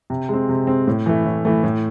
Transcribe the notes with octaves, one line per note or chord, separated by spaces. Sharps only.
C3
G#3 C4
C3
G#3 C4
A2
E3 A3
A2
E3 A3
A2